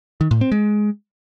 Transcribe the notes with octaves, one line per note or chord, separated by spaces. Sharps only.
D#3
A2
C4
G#3